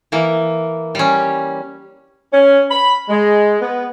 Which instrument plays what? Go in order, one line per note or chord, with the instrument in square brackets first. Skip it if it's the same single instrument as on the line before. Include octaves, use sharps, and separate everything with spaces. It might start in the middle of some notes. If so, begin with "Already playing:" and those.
[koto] E3 A#3
G3 C#4
[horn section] C#4
B5
G#3
B3